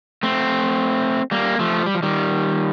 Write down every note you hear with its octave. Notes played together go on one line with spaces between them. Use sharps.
A3 C4
G3 A#3
F3 A3
G3
F3
D#3 G3